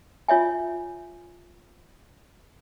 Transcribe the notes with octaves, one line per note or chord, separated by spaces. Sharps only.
F4 C#5 E5 G#5